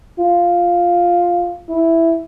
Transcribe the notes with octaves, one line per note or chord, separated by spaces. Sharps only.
F4
E4